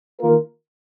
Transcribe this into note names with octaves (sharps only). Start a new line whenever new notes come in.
D#3 A#3 F4 A#4